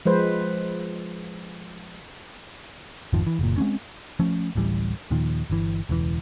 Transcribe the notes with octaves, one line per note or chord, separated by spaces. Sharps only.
F3 G#3 B4 C5
G#1 F2 D#3 F3
E3
F#1 A#2
G#3 A3 C4 C#4
F3 A3 C#4
D1 A1 E3 G3
D#2 A#2 D#3 F3
G1 E3
E1 C#2 A2 E3